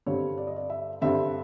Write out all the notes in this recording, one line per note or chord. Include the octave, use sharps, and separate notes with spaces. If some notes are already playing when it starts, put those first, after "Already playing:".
G2 D3 G3 C4 C#5
D5
D#5
D5
E5
G2 D3 G3 C4 E5